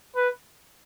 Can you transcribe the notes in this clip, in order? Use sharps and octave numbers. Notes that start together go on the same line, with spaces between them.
B4